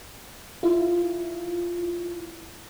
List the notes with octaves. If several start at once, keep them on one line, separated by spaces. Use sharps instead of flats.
E4 F4